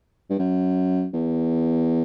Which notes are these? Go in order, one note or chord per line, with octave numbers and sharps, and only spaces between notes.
G2
F#2
E2